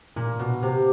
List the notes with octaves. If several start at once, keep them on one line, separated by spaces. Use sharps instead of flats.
A#2
B2
C3